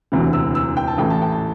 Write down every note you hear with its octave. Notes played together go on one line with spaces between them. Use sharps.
E1 D2 C3 E3
E6
E6
G5
A5
A1 A2 E3 G5
A5
G5
A5